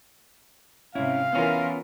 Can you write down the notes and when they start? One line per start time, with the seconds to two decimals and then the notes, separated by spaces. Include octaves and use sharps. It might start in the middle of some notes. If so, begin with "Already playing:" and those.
0.95 G#2 C3 C#4 E4 F5
1.33 E3 B3 C#4 F4 A#4